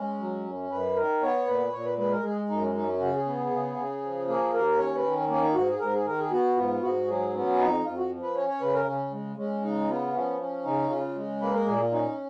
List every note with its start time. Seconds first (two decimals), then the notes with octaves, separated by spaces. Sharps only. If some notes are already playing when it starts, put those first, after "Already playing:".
Already playing: G#3 C#4
0.19 F#3
0.45 F#2
0.70 F#2 B4
0.96 D#3 A#4
1.21 B3 C#5
1.47 A#2 B4
1.72 A#2 C#5
1.85 B4
1.97 G#3 B4
2.11 A#4
2.23 G#3 G#4
2.49 F#2 D#4
2.62 C#4
2.74 C#4 D#4
3.00 C#3 F#4
3.13 G#4
3.26 B3
3.51 C#3
3.77 C#3
4.02 F3
4.28 A#3 G#4
4.53 D#2 A#4
4.78 C#4 C#5
4.96 B4
5.04 D#3
5.29 A#3 C#4
5.42 D#4
5.54 G#2 F#4
5.67 G#4
5.80 G#2 A#4
5.93 G#4
6.05 D#3 A#4
6.19 G#4
6.31 B3 F#4
6.57 G#2 F4
6.82 G#2 F#4
7.08 F#3 G#4
7.33 B3 C#4
7.59 F2 D#4
7.84 F2 F4
7.97 F#4
8.10 F3
8.22 B4
8.35 C#4 C#5
8.48 C#5
8.61 C#3 B4
8.74 A#4
8.86 C#3 C#4
9.11 G#3
9.37 G#3 C#4
9.62 C#3 D#4
9.89 B3 F4
10.14 F3 C#4
10.40 C#4
10.65 C#3 D#4
10.90 C#3 F4
11.15 G#3
11.41 A#3 B4
11.54 A#4
11.66 A#2 G#4
11.80 F4
11.91 C#4 D#4